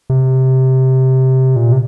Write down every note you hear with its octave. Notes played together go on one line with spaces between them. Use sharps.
C3
A#2
C3